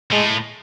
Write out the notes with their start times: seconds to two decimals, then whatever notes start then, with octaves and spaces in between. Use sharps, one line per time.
0.12 A2 G#3